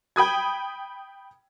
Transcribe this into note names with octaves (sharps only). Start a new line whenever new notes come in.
G5 B5 D#6 G#6